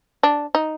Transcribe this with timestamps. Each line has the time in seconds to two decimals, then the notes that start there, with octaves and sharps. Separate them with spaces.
0.23 D4
0.55 D#4